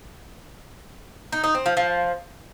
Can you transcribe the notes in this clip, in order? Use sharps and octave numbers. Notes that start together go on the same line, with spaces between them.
D#4
D#4
C4
F3
F3